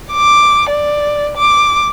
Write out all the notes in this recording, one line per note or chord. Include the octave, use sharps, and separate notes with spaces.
D6
D5
D6